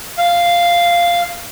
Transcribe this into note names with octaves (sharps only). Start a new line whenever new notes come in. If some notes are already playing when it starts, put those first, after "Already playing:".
F5